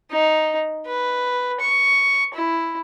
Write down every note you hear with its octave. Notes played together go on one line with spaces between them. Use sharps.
D#4
B4
C#6
E4